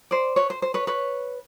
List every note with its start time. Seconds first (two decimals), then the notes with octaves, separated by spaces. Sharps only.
0.11 C5 D5
0.36 B4 C#5
0.50 C5
0.62 C5
0.74 B4 C#5
0.87 B4 C#5